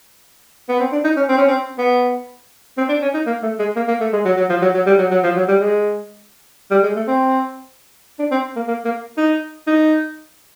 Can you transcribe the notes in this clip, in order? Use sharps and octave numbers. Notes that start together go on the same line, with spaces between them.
B3
C4
D4
D#4
C#4
C4
C#4
C4
B3
C4
D4
C#4
D#4
A#3
A3
G#3
A#3
A#3
A3
G#3
F#3
F#3
F3
F#3
F#3
G3
F#3
F#3
F3
F#3
G3
G#3
G3
G#3
A3
C4
D4
C4
A#3
A#3
A#3
D#4
D#4